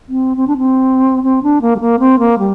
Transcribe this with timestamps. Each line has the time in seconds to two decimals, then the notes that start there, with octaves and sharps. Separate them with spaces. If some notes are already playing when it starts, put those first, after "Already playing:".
0.09 C4
0.37 C4
0.48 D4
0.58 C4
1.24 C4
1.43 D4
1.62 A#3
1.76 G3
1.80 A#3
1.99 C4
2.19 A#3
2.39 G3